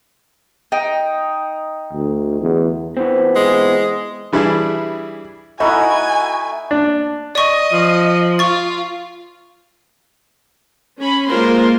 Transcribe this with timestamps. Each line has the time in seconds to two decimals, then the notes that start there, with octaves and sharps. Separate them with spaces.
0.72 D#4 G5
1.93 D2
2.42 E2
2.97 E3 B3 C4
3.36 G#3
4.33 E3 G3 D4 E4 G#4 E5
5.60 A3 D#4 E4 F#4 D#5 G#5 B5
6.71 D4
7.35 D5 D#5 C#6
7.72 F3
8.39 F4 C#6 A6
10.99 C#4 B5
11.27 G#3 A#3 F4 A#4 C5 C6